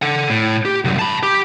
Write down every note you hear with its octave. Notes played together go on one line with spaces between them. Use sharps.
A4 F#5
A2
G4
C2 F#2
A5 B5
G4